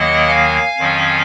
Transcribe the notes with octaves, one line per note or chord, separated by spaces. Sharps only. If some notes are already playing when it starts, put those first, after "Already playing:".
Already playing: D#2 D#3 F#3 A#3 D#5 F#5
F5 G#5
F2 D#3 F#3 C#4